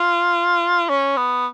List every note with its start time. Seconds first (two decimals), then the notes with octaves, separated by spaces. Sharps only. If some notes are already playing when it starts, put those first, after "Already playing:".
Already playing: F4
0.89 C#4
1.17 B3